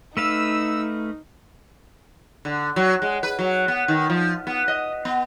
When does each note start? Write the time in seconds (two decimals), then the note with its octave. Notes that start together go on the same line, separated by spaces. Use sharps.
0.17 A3 D#4 B4 F5 E6
2.45 D3
2.76 F#3
3.02 G#3
3.23 B4
3.39 F#3
3.68 B3
3.88 D#3
4.10 F3
4.47 B3
4.68 D#5
5.05 B3